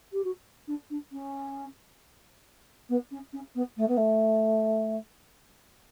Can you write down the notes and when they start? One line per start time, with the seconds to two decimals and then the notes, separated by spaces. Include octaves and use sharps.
0.12 G4
0.24 F#4
0.67 D4
0.90 D4
1.12 C#4
2.89 B3
3.11 C#4
3.33 C#4
3.55 B3
3.77 A3
3.88 B3
3.97 A3